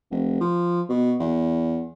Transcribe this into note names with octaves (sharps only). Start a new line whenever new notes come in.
F1
F3
B2
E2